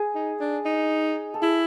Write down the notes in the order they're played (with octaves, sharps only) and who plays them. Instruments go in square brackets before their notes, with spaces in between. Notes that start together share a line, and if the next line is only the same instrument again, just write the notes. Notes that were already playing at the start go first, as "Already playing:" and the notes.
Already playing: [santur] G#4
[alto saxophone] D#4
D4
D#4
[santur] A4
[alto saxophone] E4 [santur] G#4